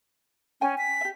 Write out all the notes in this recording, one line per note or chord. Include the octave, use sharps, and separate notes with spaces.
C#4 G5 G#5
B6
G4 E5